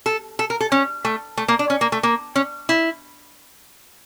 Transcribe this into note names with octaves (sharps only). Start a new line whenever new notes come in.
A4
A4
A#4
A4
C#4
A3
A3
A#3
D4
C#4
A#3
A3
A#3
C#4
E4